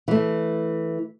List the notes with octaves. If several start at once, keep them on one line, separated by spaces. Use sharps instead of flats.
E3 A3